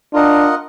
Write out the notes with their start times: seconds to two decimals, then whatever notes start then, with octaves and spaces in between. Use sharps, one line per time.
0.13 D4 F4 A#4 D#5 F#5